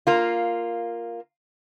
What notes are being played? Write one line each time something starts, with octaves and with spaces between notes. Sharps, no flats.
A#3 F4